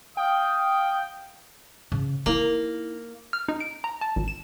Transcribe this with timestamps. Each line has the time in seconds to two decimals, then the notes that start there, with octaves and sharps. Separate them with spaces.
0.17 F5 G5 D#6
1.92 C#3
2.26 A#3 D#4 E4
3.33 F6
3.48 D#4
3.60 D7
3.84 A#5
4.01 A5
4.16 G#1
4.28 E7